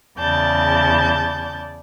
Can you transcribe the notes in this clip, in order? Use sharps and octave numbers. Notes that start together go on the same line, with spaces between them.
E2 C#3 D5 A5 G6